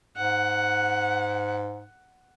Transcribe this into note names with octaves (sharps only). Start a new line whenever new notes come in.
G#2 F#5